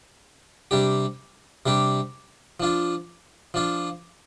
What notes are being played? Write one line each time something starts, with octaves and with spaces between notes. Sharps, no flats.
C3 G3 D4 G4
C3 G3 D4 G4
F3 D4 F4
F3 D4 F4